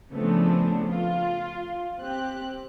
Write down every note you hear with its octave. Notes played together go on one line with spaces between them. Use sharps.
C#3 F3 A3 B3 C4 D4
F4
C4 G4 F#6